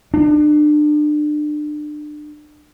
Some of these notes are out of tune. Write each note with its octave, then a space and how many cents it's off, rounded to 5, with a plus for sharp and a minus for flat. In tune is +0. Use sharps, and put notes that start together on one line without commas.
D4 +30